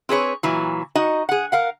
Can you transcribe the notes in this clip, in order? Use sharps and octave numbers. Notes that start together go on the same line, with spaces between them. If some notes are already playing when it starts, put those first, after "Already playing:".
C4 G#4 B4 C#5
A#2 E3 F#3
D#4 F#4 D#5
G#4 F#5
A#4 F5 F#5